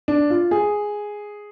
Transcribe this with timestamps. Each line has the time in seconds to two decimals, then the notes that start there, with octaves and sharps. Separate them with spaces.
0.08 D4
0.30 F4
0.51 G#4